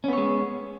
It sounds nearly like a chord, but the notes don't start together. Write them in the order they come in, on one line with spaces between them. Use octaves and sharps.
C#4 B3 C#5 G#3